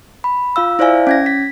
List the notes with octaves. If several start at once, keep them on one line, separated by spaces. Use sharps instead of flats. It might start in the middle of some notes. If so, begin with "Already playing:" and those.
B5
F4 F5 E6
E4 C5 D5 E5 F5 G#5
C#4 G#6 A#6
B6